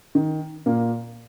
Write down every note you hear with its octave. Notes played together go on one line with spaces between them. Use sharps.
D#3
A#2 A#3